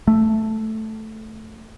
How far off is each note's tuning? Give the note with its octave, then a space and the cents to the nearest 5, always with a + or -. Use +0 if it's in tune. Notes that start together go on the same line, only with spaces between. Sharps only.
A3 -5